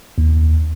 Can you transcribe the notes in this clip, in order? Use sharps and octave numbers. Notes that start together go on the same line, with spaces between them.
D#2